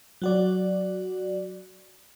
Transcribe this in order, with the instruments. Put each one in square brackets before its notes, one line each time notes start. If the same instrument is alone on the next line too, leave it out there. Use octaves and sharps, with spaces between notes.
[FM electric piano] F#3 F#4 D5